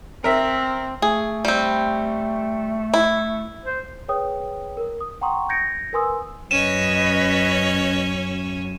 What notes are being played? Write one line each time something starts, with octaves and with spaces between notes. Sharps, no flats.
C4 A#4 E5
A3 G#4
G3 C4
E4
C5
G#4 B4 C#5 G5 D#6
A#4
D#6
F#5 G5 A#5 C6 C#6 D#6
G6 G#6 A#6 C#7 D7
A#4 B4 G#5 C6 D#6 E6
F#2 C#4 B4 C#5 D#5 D#7 E7